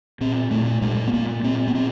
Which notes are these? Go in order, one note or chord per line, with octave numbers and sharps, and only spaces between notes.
A#2 C4
A#2 A3
A#2 G#3
B3
A#2 A#3
A#2 C4
B3
A#2 C4